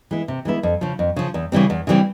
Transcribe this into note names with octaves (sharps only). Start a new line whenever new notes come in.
E3 G#3 B3 E4
C3
E3 G#3 B3 E4
F2
C#3 F3
F2
C#3 F3
E2
C#3 E3 G3 C4
E2
C#3 E3 G3 C4